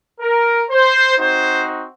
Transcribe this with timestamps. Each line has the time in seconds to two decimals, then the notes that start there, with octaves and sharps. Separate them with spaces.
0.20 A#4
0.70 C5
1.19 C4 D#4 F#4 C5